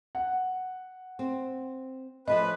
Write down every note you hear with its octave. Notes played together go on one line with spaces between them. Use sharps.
F#5
C4
F3 A3 C#4 B4 D#5